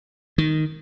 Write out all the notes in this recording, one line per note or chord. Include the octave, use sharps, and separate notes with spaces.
D#3